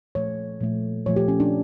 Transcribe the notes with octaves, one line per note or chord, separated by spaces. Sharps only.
A#2 F3 A3 C#5
A#2 F3 A3
A#2 F3 A3 C#5
G4
C#4
D4